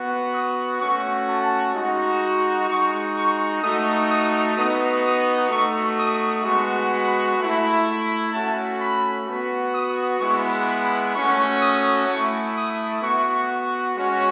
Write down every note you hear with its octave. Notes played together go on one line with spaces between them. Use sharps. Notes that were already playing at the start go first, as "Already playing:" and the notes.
Already playing: B3 F#4
D#6
A3 C#4 F#4 C#6
A5
G#3 D#4 F#4
G#3 D#4 F#4 C#6
C#6
A3 D#4 F#4 D#6
D#6
B3 D#4 F#4 D#6
D#6
A3 D#4 F#4 C#6
D#6
G#3 B3 F#4 C#6
B5
A3
E4
A3 C#4 F#4 A5
B5
B3 F#4
D#6
G#3 B3 E4 C#6
B5
A3 C#4 F#4 C#6
D#6
A3 E4 C#6
D#6
B3 F#4 C#6
G#3 C#4 F#4